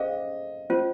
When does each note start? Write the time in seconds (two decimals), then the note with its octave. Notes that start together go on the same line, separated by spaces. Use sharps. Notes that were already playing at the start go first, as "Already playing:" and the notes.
Already playing: C#4 G#4 C5 D#5 F5
0.70 C#4 F4 C5